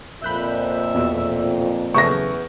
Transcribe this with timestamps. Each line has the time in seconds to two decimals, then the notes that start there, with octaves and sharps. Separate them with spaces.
0.22 F2 A#2 E5 B5 F#6 G6
0.95 E2 B2
1.94 E2 C#3 F#3 A3 C#6 A#6